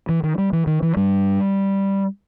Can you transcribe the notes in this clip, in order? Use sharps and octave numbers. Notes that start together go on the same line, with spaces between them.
E3
D#3
G3
E3
D#3
E3
G2 G3